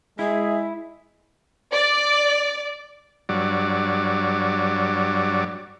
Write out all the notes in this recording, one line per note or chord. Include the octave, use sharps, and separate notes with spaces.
G#3 E4 G#4 E5
D5
G2 F#3 D5